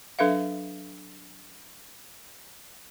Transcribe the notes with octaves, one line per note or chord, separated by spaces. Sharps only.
F#3 D4 A4 B4 E5 F5